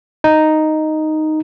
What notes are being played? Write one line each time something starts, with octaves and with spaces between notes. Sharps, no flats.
D#4